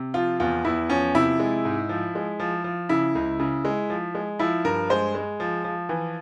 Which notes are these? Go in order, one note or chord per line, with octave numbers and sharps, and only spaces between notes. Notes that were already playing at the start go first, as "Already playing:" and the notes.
Already playing: C3
F3 F4
E2 F4
E2 E4
F3 C#4
C3 E4
G#3
G#2
F3
G#3
F3
F3
C#3 E4
C#2
C#3
G#3
F3
G#3
F3 E4
G2 A#4
G#3 C5
G#3
F3
F3
E3